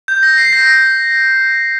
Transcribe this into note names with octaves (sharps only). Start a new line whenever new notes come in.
G6
A#6
C7
A#6
A#6